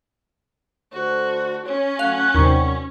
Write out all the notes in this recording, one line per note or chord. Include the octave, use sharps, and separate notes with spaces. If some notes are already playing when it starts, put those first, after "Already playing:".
D3 A3 F#4 C5
C#4 C#5
F#3 A3 F#4 F5 F#6
D#2 C3 F#3 G3 C#6